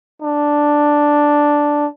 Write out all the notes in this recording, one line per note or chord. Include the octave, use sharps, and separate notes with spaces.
D4